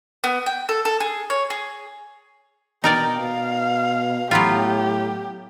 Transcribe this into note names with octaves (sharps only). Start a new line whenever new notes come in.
B3
G5
A4
A4
G#4
C#5
G#4
B2 D#4 A#4 D5 G5
B2 F5
A2 F#3 B3 F4 G4